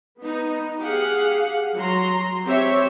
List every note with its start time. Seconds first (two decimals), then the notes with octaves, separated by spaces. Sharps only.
0.19 B3 D#4
0.80 G4 G#4 F5 F#5
1.75 F#3 A#5 C6
2.44 C4 G4 C#5 E5